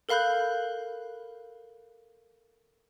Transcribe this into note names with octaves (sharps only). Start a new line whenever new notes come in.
A4 A#4 F5 B5 F#6 G6